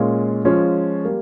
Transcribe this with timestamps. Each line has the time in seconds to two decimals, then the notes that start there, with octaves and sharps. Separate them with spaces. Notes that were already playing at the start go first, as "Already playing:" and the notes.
Already playing: A#2 G#3 C#4 F4
0.45 F3 G#3 C#4 F4
1.04 G3 A#3